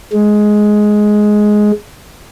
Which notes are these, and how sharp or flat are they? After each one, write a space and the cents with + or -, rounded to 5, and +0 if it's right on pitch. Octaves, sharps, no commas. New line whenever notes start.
G#3 +10